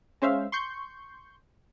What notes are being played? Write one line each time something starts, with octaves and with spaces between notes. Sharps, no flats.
G#3 C#4 C5 E5 F5
C6 C#6 G6